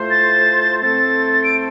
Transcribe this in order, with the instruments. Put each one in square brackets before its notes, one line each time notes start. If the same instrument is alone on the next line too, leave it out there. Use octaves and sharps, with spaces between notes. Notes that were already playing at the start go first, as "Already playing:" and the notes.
Already playing: [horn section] A2 A3 F4 C5
[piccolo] A6
[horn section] A2 A3 C4 A4 C5 [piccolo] A6
[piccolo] D7